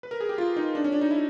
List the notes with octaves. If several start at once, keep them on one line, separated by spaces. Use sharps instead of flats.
B4
A#4
G#4
G4
F4
D#4
D4
C#4
D4
D#4
E4